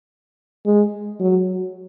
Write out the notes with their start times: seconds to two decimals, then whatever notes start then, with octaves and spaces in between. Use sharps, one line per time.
0.66 G#3
1.20 F#3